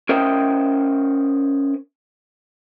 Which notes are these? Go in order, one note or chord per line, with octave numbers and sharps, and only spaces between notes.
C#4 A#4 C5 D#5 E5 G5